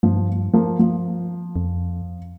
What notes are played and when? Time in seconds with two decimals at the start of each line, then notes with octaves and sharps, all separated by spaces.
0.03 G2 F3
0.53 F3 A#3
0.79 F3
1.56 F2